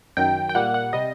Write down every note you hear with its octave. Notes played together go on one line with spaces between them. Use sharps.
F#2 D#3 F#3 G5
G5
A#2 G3 A#3 F#5
F#5
C3 G3 D#5